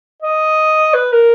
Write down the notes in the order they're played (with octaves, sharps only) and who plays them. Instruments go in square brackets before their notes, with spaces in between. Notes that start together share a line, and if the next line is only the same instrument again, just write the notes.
[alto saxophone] D#5
B4
A#4